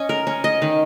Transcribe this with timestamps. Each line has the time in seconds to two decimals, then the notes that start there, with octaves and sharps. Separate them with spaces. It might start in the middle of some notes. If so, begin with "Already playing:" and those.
Already playing: C#4 D#5
0.09 A#4
0.27 C#4
0.44 D#5
0.62 D#3